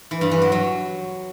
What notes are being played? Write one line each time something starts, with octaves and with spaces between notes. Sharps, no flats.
E3
G2
E3
F#3
F#3